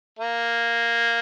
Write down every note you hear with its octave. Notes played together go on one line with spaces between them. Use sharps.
A#3